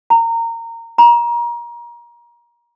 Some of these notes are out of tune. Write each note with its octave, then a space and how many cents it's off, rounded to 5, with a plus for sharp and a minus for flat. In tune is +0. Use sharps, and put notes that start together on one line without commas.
A#5 -20
A#5 +30